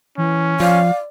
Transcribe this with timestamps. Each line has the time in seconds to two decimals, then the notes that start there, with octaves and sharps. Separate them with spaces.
0.18 E3 C#4
0.60 F3 D5 F5